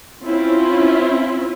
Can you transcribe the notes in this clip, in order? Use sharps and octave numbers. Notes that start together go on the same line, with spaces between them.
C4 C#4 E4 F4